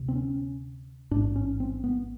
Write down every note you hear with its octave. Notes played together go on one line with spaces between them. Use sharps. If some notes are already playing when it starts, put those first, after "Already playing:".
Already playing: D2 C3
C4
C#4
A1 G#2 D4
C#4
C4
B3